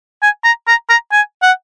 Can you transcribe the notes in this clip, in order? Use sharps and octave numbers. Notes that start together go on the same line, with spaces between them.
G#5
A#5
A#5
A#5
G#5
F#5